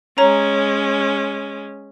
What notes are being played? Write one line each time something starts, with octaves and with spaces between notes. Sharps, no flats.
G#3 C#4 C#5 A#5